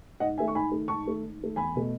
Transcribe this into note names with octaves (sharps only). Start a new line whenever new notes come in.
G#2 D#5 F#5
D#3 A3 E5 G#5
C#6
G#2 G#5 B5
D#3 A3
G#2 A5 C#6
D#3 A3
G#2
D#3 A3
E1 G#5 B5
B2 A3